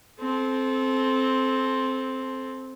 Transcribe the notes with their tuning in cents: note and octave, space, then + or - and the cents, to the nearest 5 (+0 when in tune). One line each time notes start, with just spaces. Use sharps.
C4 +0 A4 -25